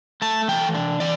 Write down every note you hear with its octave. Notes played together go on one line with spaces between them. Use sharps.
A3 A5
E3 G5
D4
E3 D5